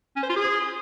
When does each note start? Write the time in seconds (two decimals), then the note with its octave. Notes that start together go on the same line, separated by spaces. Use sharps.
0.16 C#4
0.23 C5
0.30 F4
0.36 G#4